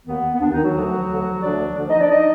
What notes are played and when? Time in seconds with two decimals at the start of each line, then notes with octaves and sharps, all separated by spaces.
0.06 D#2 D#3 B3
0.35 B3
0.40 D#2 D#3 D4
0.52 D#3 D#4
0.63 F#3 F#4
0.75 D2 D3 F3
1.09 D2 D3 F3
1.43 D2 D3 F3 D4 D5
1.77 D2 D3 F3
1.88 D#4 D#5
2.00 D4 D5
2.11 F3 D#4 D#5